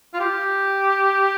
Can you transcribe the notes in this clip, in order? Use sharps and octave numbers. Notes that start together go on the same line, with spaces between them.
F4
G4